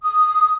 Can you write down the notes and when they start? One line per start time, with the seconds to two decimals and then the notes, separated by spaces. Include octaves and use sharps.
0.03 D#6